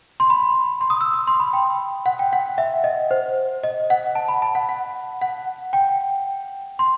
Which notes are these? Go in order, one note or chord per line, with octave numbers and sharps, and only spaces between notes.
C6
B5
C6
D#6
E6
D#6
C6
B5
G5
F#5
G5
F#5
E5
D#5
C5
D#5
F#5
A5
B5
A5
F#5
F#5
F#5
G5
C6